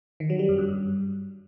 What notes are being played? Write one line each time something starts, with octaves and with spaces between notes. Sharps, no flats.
D#3
F#3
G3
F#2
G2